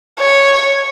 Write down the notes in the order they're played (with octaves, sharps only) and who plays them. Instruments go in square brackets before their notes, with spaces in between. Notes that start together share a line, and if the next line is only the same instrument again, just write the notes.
[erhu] C#5